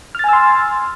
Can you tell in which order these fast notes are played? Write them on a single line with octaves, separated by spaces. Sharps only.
F6 A6 G#5 E6 C6